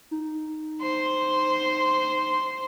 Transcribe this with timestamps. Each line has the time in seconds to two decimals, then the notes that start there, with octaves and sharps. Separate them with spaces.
0.11 D#4
0.82 C5 C6